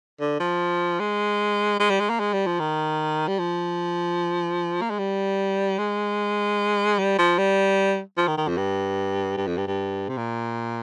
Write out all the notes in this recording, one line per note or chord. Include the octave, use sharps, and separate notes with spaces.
D3
F3
G#3
G#3
G3
G#3
A#3
G#3
G3
F3
D#3
G3
F3
A#3
G#3
G3
G#3
G3
F3
G3
F3
D#3
D#3
F2
G2
G2
F2
G2
G2
C3
A#2